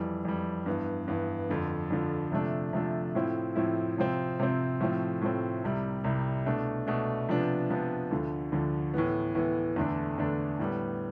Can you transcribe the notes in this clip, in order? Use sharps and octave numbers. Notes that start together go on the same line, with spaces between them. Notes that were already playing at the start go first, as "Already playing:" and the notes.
Already playing: F2 E3 G3
F2 E3 G3
G2 E3 B3
G2 E3 B3
F2 D3 F3
F2 D3 F3
C3 F3 A3 D4
C3 F3 A3 D4
A2 F3 C4 E4
A2 F3 C4 E4
C3 F3 C4
C3 F3 C4
A2 F3 A3 C4
A2 F3 A3 C4
C2 C3 G3
C2 C3 G3
B2 A3 D4
B2 A3 D4
C3 F3 B3 D4
C3 F3 B3 D4
D2 D3 F3
D2 D3 F3
A2 E3 B3
A2 E3 B3
E2 D3 A3 D4
E2 D3 A3 D4
A2 G3 B3